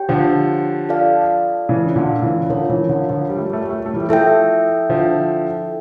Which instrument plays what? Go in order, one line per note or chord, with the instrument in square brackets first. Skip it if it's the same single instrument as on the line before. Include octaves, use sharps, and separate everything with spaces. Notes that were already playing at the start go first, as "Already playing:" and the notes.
Already playing: [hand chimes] G4 C#5 G5
[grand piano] D3 F3
[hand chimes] F4 A4 D5 F5 A5
[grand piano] C#3 E3
A#2 D3
C#3 E3
[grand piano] D3 F3 [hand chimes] F4 A#4 C#5
[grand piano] C#3 E3
D3 F3
D3 F3
G3
A3
G3
A3
G3
A3
G3
A3
E3 G3
[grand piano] F3 A3 [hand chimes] E4 A4 E5 G5
[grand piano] D3 F3